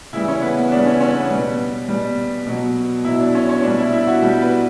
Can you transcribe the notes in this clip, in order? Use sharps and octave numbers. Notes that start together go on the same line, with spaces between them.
C#3 E3 G3 E4
C#4
B3
B3
C#3 E3 G3 D4
C#4
C#4
B3
B2 G3
B2 G3
B2 F#3
B2 F#3 E4
D4
C#4
C#4
B2 G3 D4
E4
E4
F#4
B2 G3 G4
B4